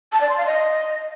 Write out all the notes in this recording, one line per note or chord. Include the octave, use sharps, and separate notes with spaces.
A5
D5
C6
F5
D#5